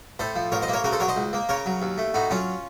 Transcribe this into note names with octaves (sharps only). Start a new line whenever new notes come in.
A2 A4 C5
F3
A1 A#4 C#5
C5 D#5
A#3
A#4 C#5
C#3 F#4 A#4
A4 C5
F#3 A#4 C#5
C5 D#5
C#2
A#3
C#3 A#4 C#5
F#3
D#2
A3
A2 D#4 F#4
F#3 C#4 F4